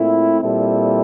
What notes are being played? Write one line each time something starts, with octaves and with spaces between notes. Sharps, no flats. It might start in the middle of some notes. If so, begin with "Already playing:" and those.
Already playing: A#2 A3 C4 E4
A#2 G3 C4 E4 A4